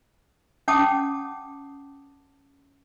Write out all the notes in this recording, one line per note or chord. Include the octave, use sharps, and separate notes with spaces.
C#4 F#5 G5 A5 D6 D#6